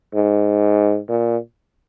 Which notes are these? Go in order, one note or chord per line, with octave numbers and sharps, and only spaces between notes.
G#2
A#2